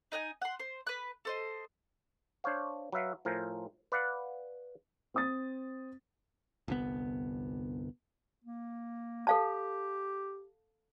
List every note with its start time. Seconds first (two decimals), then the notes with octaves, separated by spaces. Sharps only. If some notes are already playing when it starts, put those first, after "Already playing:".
0.12 D#4 D#5 F#5 G#5
0.42 F#5 C6
0.60 C5
0.87 B4 F#6
1.25 A4 C5 D#5
2.44 D4 C5 C#5 F5
2.92 F#3 B4 E5 F5
3.25 A2 F3 A#4 C5 G#5
3.92 B4 D5 F5 F#5
5.14 C4 D#6 A6
6.68 G1 C2 B3
8.44 A#3
9.27 G4 A4 F5 A5